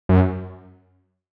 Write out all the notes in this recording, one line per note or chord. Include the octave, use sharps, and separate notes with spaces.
F#2